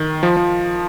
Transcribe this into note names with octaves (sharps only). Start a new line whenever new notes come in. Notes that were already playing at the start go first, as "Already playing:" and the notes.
Already playing: D#3
F3
F3